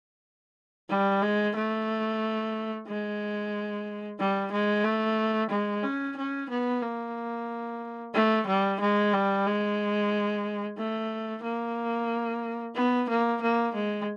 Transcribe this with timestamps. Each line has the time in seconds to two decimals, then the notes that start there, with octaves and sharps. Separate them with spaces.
0.89 G3
1.22 G#3
1.55 A3
2.87 G#3
4.18 G3
4.52 G#3
4.84 A3
5.50 G#3
5.83 C#4
6.16 C#4
6.49 B3
6.82 A#3
8.14 A3
8.47 G3
8.80 G#3
9.13 G3
9.46 G#3
10.78 A3
11.43 A#3
12.75 B3
13.09 A#3
13.41 A#3
13.74 G#3